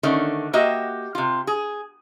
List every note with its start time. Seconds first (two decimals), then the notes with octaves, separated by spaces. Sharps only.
0.03 D3 D#3 A3 C#4
0.53 A#3 F#4 G4 D#5 E5
1.15 C3 F4
1.47 G#4